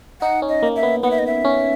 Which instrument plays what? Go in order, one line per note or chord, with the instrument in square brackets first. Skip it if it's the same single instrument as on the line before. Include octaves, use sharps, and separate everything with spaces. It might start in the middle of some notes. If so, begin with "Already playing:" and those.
[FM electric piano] D#4 [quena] F#5
[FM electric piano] C#4
[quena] D#5
[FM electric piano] A#3
[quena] E5
[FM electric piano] B3
[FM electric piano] B3 [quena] F#5
[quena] E5
D#5
E5
[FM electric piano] C#4